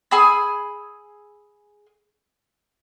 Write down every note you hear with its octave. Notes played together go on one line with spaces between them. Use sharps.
G#4 G#5 B5 E6